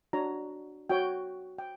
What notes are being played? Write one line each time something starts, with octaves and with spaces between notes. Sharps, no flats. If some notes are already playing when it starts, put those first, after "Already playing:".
D4 F#4 C#5 A#5
F#4 C#5 G5
G5